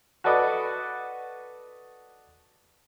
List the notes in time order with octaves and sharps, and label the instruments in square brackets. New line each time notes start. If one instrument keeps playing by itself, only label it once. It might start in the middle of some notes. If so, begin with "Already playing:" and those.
[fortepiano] F#4 A4 B4 D5 D#5